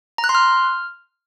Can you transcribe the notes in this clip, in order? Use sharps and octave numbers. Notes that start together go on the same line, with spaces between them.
A#5
F#6
C6
F6